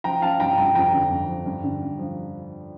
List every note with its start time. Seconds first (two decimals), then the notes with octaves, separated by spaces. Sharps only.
0.04 F3 G5 A#5
0.22 F3 F5 A5
0.40 G2 G5 A#5
0.57 G2 G5 A#5
0.75 F2 G5 A#5
0.93 D3
1.11 F2
1.29 F3
1.46 G2
1.64 D3
1.82 G2
1.99 F3